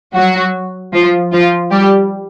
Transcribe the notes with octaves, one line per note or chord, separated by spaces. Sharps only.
F#3 F#4
F3 F4
F3 F4
G3 G4